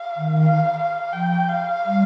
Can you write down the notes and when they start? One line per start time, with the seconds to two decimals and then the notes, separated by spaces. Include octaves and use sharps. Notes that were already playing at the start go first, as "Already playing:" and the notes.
Already playing: F5
0.16 D#3
0.40 F5
0.77 F5
1.12 F3 G5
1.49 F5
1.85 G3